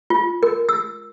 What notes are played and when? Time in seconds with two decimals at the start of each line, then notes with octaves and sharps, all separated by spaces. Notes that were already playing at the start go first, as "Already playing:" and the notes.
0.10 F4
0.43 A#4
0.69 E6